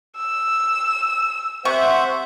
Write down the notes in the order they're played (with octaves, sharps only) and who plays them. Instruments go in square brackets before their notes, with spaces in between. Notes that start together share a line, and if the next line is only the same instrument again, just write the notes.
[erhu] E6
[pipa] C3 C#6 [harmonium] C5 E5 F#5